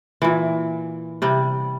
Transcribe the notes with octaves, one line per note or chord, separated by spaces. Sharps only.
A#2 E3
C3 G3